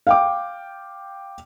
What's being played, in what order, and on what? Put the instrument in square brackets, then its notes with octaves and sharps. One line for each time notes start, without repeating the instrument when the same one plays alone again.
[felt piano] F5 G5 D6